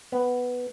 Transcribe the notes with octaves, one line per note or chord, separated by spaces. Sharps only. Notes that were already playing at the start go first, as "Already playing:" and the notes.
B3